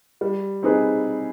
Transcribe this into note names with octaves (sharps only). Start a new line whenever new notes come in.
G3
C4 D#4 G#4 B4